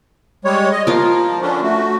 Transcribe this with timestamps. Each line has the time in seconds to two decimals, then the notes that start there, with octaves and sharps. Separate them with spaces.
0.45 G3 G#3 C#5
0.72 D#5
0.87 F3 F4 A#4
1.41 D3 C#4 D4
1.63 A3 F#4